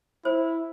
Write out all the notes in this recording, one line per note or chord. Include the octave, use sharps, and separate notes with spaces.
E4 C5